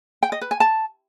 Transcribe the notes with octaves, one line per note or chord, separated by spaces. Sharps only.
G5
D#5
B4
G#5
A5